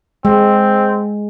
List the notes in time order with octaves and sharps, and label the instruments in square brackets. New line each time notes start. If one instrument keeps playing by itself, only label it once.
[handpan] G#3 [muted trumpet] C4